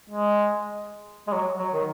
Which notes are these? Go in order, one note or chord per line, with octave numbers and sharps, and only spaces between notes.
G#3
G#3
F#3
F#3
D#3